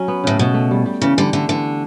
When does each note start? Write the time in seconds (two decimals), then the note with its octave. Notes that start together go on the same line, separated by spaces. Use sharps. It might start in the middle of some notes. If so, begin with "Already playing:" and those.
Already playing: F#3 C#4
0.08 B3
0.24 A2 C#3
0.39 B2 A3
0.54 A3
0.71 G3
0.86 G3
1.02 C#3 E3
1.17 D3 G3
1.33 D3 A3
1.49 D3 E3